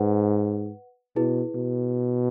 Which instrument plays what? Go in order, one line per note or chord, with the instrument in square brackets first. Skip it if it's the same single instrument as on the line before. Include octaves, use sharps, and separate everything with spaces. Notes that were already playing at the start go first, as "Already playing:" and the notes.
Already playing: [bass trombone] G#2 [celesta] B4 F#5
[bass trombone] B2 [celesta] E4 G#4 B4
[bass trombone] B2